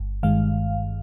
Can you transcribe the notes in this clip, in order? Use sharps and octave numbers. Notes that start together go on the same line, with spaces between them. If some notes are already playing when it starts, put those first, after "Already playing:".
Already playing: G1
G2 D#3 G#3 F5